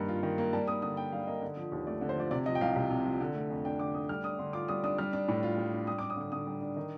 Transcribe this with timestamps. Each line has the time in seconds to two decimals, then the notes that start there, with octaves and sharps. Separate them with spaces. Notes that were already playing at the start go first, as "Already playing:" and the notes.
Already playing: G2 D#3 A#3
0.09 F4
0.23 D#3
0.38 A#3
0.53 G3 A5
0.68 A#3 D#6
0.82 D3 D#6
0.97 D4 G5
1.12 G3 F5
1.27 A#3 D#5
1.42 D3
1.57 F3
1.72 D#2
1.87 A3 D5
2.01 D3
2.09 C5
2.16 F3 D5
2.31 C3 D5
2.46 F3 D#5
2.55 G5
2.61 C2 F5
2.76 C2
2.90 C3
3.05 F3
3.21 D3
3.35 A3
3.50 F2
3.65 D4 G5
3.79 D3 D6
3.94 A3 D#6
4.09 G3 F6
4.24 D4 D#6
4.39 D3 C6
4.53 F4 D6
4.68 G3 D#6
4.84 D4 D#6
4.98 G3 F6
5.13 D4
5.28 A2
5.43 F4
5.58 G3
5.73 D4
5.87 G3 D#6
5.98 D4 D6
6.10 D#6
6.17 D3 D6
6.32 D3 D#6
6.47 G3
6.61 D4
6.76 D#3